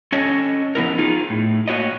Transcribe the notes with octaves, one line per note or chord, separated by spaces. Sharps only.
C#4 A4 C#5 D#5
F3 B3 E4 A#4
D#4 F4 G#4
A2
A#3 F#4 C#5 D#5